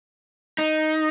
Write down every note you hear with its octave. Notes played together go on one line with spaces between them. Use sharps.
D#4